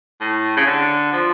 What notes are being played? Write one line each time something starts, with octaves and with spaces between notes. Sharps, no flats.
A2
C#3
D3
F3